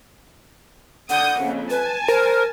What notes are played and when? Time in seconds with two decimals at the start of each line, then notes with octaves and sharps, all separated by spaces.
1.10 D3 F#5 D#6 G6
1.39 F2 C#3 A#3
1.70 B4 G#5 A5
2.08 A#4 C5